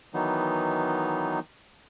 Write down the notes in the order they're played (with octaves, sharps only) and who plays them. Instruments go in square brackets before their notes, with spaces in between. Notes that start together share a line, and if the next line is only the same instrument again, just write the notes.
[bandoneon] D#3 E3 F#3 B3 D#4